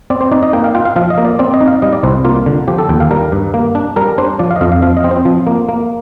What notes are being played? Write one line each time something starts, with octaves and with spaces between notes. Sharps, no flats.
C4 D5
C5
D#4 D5
D#5
A#3 G5
F5
F4 G5
F5
F3 F5
D#5
A#3
D5
C4 D5
D#5
D#4
F5
G3 D#5
D5
C2 C5
A#3 F4
D3
F3 G4
A4
D#2 G5
F5
G3 A#4
G2
A#3
D4
G3 A#4
D4 C5
F3 D5
F5
D#5
F2 F5
F5
F3 F5
D#5
C4
C5
F3
A#3
A#3